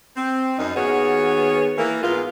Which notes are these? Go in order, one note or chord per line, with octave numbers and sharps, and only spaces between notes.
C4
F#2 D#4
D#2 D#3 B3 F#4 G#4 C#5
E3 A#3
G#2 B3 F4